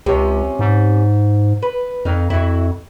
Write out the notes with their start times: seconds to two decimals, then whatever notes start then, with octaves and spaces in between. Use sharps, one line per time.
0.06 C#2 C3 C#4
0.59 G#2
1.62 B4
2.05 F2 D#4 F5
2.30 F2 E4 F#4